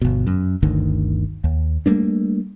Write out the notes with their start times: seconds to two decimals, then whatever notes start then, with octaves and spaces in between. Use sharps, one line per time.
0.01 G1 B2
0.27 F#2
0.63 G1 D2 D#3
1.44 D#2
1.86 G3 A3 A#3 D4